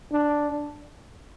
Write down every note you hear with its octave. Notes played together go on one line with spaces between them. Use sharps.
D4